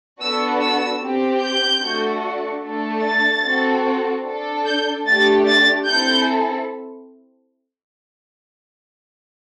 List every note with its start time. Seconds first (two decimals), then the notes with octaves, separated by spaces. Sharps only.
0.20 B3 D4 F#4 A4 E6
0.61 E6
1.01 C4 G4
1.42 G6
1.82 A3 D4 F#4 A4
2.63 A3 D4 A4
3.04 A6
3.44 C4 F#4 A4
4.26 D4 A4
4.66 G6
5.07 A3 D4 G4 A6
5.47 A6
5.87 C4 E4 A4 G6